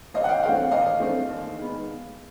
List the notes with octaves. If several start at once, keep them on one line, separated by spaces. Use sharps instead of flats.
G#1 D#5 F5
F#5
F5 G5
G2 E3 A3 C4 F5 G5
G#1 D#5 F5
G2 E3 A3 C4
D#2
D#3 G#3 B3